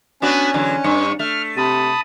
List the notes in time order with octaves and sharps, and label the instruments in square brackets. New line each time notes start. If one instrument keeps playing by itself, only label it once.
[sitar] B3 D4 F#4 [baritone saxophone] C#4
[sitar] E2 D3 F#3
[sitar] G2 [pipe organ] C#6
[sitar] A3 [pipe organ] F6
[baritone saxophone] C3 [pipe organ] A5 B5 D#6